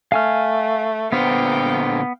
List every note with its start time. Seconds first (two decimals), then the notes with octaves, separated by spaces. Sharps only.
0.12 A3 F5 G#5 F6
1.12 A#2 D3 B3 C5 F5 G5